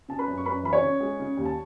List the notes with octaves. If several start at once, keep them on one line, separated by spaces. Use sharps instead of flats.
C#3 A5
B4 B5
F#2
C#6
F#2 B4 B5
E3 B5
C#5 C#6
C#3
G#3
C#3
D#2
A5